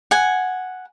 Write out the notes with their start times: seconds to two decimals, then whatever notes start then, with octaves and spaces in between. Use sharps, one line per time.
0.11 F#5 G#5